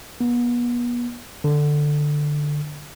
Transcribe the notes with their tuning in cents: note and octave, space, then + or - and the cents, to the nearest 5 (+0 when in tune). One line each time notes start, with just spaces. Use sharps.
B3 -35
D3 +10